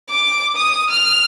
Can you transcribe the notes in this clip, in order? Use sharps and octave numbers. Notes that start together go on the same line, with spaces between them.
D6
D#6
F6